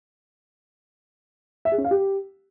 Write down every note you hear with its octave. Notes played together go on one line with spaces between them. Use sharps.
E5
G#4
C#4
F5
G4